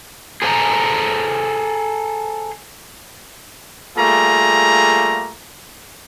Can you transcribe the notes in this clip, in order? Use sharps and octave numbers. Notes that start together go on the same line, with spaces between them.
G#4 A4 C5 E5 G#5 A#5
G3 A3 A#3 F4 G#4 A#5